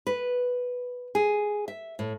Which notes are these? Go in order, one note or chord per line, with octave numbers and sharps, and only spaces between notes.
B4
G#4
E5
A2